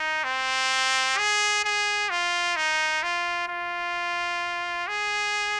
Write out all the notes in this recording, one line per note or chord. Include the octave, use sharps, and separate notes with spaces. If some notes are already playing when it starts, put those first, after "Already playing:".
Already playing: D#4
C4
G#4
G#4
F4
D#4
F4
F4
G#4